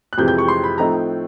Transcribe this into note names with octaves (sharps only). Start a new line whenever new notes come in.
F#6
F2 C3 E3 G#3 G6
G6
C#6
C6
B5
A2 F3 A3 C4 D#4 A#5